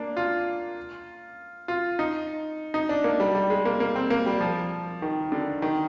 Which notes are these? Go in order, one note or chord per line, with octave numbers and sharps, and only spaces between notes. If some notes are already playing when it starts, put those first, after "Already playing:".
Already playing: A#3 D4
F4
F4
D#4
D#4
D4
A#3
G3
G3
G#3
A#3
A#3
C4
A#3
G3
F3
D#3
D3
D#3